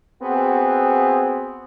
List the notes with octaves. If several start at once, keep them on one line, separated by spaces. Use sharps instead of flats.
B3 C4 F#4 G#4